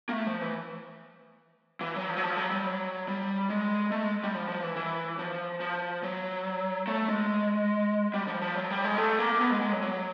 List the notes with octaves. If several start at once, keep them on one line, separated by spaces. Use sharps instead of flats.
A#3
A3
F3
E3
E3
F#3
F3
F#3
F3
F#3
G3
F#3
G3
G#3
A3
G#3
G3
F3
F3
E3
E3
F3
F3
F#3
A3
G#3
G3
F3
F3
F#3
G3
G#3
A3
A#3
B3
G#3
G#3
F#3
F#3